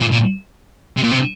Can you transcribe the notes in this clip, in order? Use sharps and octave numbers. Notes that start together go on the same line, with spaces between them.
A#2
A#2
C3
A#2
C3